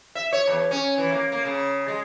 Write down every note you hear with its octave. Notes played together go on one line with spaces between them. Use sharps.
E5
C#5
E2
C#4
E3
A#3
A#3
C#3
G#3